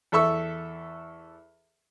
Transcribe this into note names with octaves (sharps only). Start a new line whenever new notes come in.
E2 A4 E5 C#6 E6